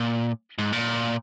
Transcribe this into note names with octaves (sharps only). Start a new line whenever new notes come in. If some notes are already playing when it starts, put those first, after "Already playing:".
Already playing: A#2
G#2
A#2